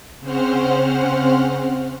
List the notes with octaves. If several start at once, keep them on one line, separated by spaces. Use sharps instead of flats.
C#3 C4 C#4 C5 F#5 F6